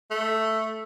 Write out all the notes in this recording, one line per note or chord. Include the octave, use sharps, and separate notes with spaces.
A3